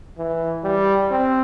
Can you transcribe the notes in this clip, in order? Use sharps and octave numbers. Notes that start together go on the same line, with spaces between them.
E3
G3
C4